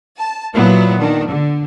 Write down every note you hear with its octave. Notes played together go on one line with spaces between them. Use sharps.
A5
A#2 F#3 B3 E4
D#3 D4
D3